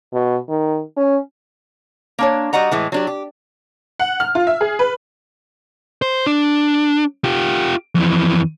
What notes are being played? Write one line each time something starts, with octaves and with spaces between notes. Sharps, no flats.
B2
D#3
C#4
A#3 D4 C#5
G3 F#4 D#5 F#5 A#5
A2 E3 G#3
F#3 D4 G4
G4
F#5
F6
F4
E5
G#4
B4
C5
D4
F4 G4
F2 E3